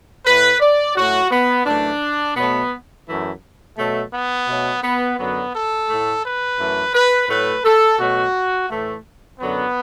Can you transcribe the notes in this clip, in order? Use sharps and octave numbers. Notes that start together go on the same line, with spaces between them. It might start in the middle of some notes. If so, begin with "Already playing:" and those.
A2 A3 B4
D5
A2 F#3 A3 F#4
B3
F#2 E3 A3 D4
B2 F#3 A3 B3
F#2 E3 A3
B2 F#3 A3
B3
B2 F#3 A3
B3
F#2 D3 F#3 B3
A4
A2 A3
B4
F#2 E3 A3
B4
A2 F#3 A3 B4
A4
B2 F#3 A3 F#4
A2 E3 A3
F#2 D3 F#3 B3